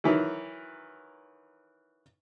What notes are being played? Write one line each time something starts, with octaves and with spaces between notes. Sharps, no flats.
D#3 E3 F#3